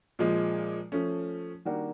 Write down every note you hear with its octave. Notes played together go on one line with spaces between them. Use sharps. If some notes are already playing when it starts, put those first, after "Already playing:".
A#2 F3 G#3
F3 A3 C#4
D#3 G3 A#3 D4 F#4